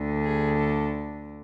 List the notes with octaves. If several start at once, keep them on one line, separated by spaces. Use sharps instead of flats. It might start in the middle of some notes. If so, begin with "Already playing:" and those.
Already playing: D2 D3
G#4
A4